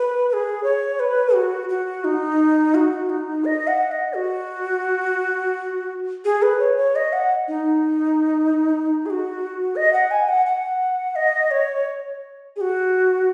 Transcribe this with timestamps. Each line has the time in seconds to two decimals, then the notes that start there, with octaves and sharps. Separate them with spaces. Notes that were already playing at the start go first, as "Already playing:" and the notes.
Already playing: B4
0.29 B4
0.33 G#4
0.64 C#5
1.00 B4
1.34 F#4
1.69 F#4
2.04 D#4
2.75 F#4
3.09 D#4
3.45 D#5
3.67 F#5
3.91 D#5
4.14 F#4
6.25 G#4
6.42 B4
6.60 C#5
6.78 C#5
6.96 D#5
7.13 F#5
7.48 D#4
9.06 G#4
9.10 F#4
9.76 D#5
9.93 F#5
10.11 G#5
10.29 F#5
10.46 F#5
11.16 D#5
11.51 C#5
12.56 G#4
12.61 F#4